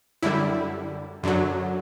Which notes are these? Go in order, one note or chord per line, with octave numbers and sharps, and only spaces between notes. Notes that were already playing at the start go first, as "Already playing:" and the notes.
F#2 D3 G3 E4
F#2 D3 F#3